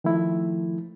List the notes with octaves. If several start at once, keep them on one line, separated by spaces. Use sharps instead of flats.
D#3 F3 A3 E4